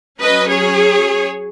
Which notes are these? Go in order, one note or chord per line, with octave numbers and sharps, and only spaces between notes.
F#3 C#4 B4 D#5
G#4 C#5